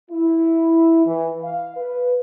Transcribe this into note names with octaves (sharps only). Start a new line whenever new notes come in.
E4
E3
F5
B4